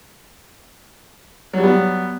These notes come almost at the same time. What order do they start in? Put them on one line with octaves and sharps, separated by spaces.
F#3 G3 B3